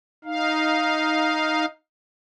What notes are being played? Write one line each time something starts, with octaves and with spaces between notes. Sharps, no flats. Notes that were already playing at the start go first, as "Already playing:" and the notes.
D#4 F5